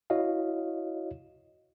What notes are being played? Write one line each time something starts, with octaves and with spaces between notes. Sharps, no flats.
E4 F#4 C#5 D#5 F5